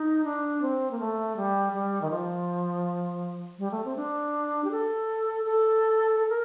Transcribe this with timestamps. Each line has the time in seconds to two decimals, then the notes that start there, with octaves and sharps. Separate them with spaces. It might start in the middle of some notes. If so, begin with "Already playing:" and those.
Already playing: D#4
0.24 D4
0.62 C4
0.91 A#3
0.99 A3
1.36 G3
1.73 G3
2.02 D#3
2.11 F3
3.59 G3
3.71 A3
3.85 C4
3.96 D4
4.64 G4
4.71 A4
5.45 A4
6.20 A4
6.29 A#4